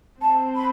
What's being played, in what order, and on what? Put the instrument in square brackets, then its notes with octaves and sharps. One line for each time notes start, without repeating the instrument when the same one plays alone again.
[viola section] C4 [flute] A5
[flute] B5